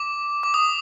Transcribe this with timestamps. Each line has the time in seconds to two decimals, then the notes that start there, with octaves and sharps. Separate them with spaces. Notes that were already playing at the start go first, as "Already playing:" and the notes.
Already playing: D6
0.43 D6
0.54 D#6